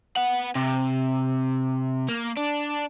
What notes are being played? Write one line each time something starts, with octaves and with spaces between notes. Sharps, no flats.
B3 F#5
C3
A#3
D4